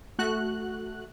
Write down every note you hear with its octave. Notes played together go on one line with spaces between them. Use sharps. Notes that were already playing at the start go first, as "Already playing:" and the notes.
A3 F#4 F#6